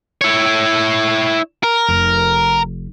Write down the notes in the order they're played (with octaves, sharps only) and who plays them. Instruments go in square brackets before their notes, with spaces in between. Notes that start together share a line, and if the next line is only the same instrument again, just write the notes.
[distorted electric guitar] E4 C#5
A#4
[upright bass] F1